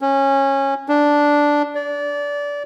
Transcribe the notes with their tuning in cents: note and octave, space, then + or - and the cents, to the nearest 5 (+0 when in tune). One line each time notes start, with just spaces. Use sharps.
C#4 -20
D4 -5
D5 -25